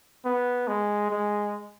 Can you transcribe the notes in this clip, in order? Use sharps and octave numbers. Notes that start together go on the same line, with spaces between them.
B3
G#3
G#3